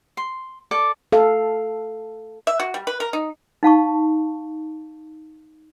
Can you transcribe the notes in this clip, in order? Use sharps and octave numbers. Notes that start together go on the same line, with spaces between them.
C6
A4 D5 D6
A4 F5
E5
F#4
G3
B4
A#4
D#4
D#4 F5 A5 C#6